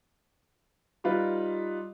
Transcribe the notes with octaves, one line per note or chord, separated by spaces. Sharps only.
G3 D#4 F4 B4